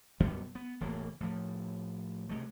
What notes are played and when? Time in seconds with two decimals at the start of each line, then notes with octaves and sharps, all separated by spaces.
0.20 F#2 B2 G3 B3
0.55 B3
0.81 E1 A2 C#3 A#3
1.20 A2 F3
2.29 C3 G#3 A3